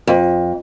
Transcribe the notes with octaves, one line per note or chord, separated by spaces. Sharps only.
F2